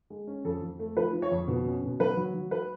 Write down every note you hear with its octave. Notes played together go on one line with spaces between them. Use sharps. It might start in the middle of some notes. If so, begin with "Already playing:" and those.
G#3
C#4
F2 A4
F2
A3
F3 B4
F3
C#5
F2
B2
C#4
B2
F#3 B4
F#3
F#3
B4